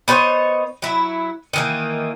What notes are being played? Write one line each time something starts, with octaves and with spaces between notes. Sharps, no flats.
B3 D#4 C5 C#5
F#3 E4
D#3 E3 A#3